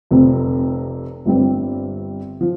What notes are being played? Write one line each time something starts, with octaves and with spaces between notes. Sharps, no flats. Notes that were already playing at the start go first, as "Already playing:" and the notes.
F1 F2 C3
G1 G2 G3 C4
F3